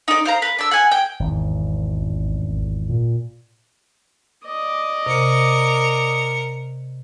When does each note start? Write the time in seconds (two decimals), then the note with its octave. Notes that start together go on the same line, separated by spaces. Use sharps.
0.08 D#4 D5
0.25 C5 F5 A#5
0.42 B4
0.59 D4 E6
0.71 F#5 G#5
0.91 G5
1.20 G#1 E2
1.99 A1
2.89 A#2
4.46 D5 D#5
5.06 C3 A#4 C#7